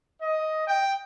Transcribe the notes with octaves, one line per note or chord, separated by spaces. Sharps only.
D#5
G5